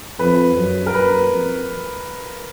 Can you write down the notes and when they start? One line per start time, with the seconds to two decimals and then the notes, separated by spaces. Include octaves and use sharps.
0.19 F2 B4
0.57 F#2
0.86 A#4
0.94 F#2 B4
1.31 F2